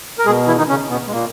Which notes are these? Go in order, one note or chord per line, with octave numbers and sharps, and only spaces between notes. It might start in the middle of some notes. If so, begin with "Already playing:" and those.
A#4
B2 G#3 G#4
E3 E4
D#3 D#4
C#3 C#4
B2 B3
G#3
A#2 A#3